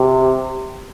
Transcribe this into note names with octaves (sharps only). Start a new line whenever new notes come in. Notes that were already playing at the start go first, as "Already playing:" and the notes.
Already playing: C3